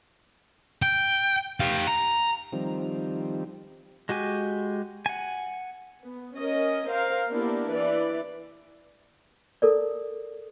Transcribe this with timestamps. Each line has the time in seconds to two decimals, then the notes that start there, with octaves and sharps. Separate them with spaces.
0.82 G5
1.60 G4 F5
1.87 A#5
2.53 D#3 F3 G3 C4
4.09 G#3 F#4 G4 G#5
5.06 F#5 G#5
6.05 B3
6.38 C#4 A#4 D#5
6.89 A#4 C5 F5
7.30 A#3 B3 D4 E4 G4 A#4
7.72 E3 B4 D5
9.62 A4 A#4 D5